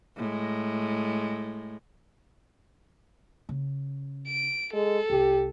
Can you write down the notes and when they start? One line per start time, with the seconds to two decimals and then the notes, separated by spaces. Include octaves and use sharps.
0.16 A2 G#3
3.49 C#3
4.28 D7
4.73 G#3 A4
5.10 C2 G4